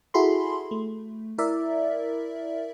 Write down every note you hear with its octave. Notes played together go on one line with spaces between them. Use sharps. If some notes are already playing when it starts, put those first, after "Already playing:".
E4 F#4 G#4 A4 B5 C6
A3
E4 A#4 D5 E5